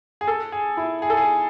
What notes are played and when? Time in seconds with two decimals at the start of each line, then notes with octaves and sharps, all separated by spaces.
0.21 G#4
0.28 A4
0.52 G#4
0.77 E4
1.02 G#4
1.10 A4
1.17 G#4